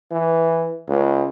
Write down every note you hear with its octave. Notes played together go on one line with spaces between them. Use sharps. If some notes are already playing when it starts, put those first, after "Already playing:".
E3
C#2